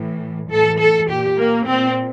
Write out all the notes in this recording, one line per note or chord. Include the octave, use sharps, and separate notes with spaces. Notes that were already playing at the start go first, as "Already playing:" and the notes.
Already playing: A2 E3
A2 E3 A4
A4
A#2 G4
A#3
A#2 C4